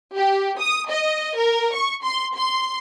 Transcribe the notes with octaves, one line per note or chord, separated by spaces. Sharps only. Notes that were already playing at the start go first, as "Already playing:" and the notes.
G4
D#6
D#5
A#4
C#6
C6
C6